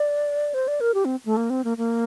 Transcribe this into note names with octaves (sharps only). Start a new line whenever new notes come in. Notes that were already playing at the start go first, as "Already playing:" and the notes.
Already playing: D5
C5
D5
A#4
G4
C4
A3
A#3
C4
A#3
A#3